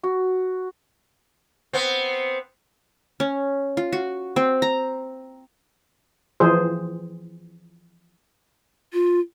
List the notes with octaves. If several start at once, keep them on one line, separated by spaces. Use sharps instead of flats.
F#4
B3 C4
C#4
F4
F#4
C4
A#5
E3 F3 G#4 C5
F4